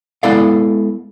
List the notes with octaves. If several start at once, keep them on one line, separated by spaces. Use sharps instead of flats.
G#3 B3 E4 A4 D5 F5